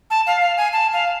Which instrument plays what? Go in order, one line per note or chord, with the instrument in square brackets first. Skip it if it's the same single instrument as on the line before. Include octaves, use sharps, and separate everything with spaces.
[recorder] A5
F5
F5
G#5
A5
F5